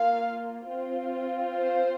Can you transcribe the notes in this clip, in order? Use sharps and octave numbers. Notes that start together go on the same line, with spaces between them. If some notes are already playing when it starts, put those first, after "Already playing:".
Already playing: A#3 F4 F5
C4 F4
C5